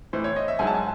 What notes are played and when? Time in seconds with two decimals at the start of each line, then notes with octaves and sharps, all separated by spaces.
0.13 A2 E3 C5
0.24 C#5
0.36 D#5
0.48 E5
0.59 G#2 F#3 G#5
0.67 A5
0.75 G#5